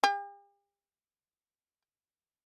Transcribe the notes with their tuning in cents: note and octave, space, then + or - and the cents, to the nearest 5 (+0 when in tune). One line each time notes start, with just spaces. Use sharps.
G4 +45